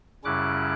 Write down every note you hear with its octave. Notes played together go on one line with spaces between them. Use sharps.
F#2 C#3 G3 C#4 E4 D6 F#6